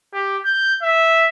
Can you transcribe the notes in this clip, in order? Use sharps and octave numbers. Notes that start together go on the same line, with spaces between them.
G4
G6
E5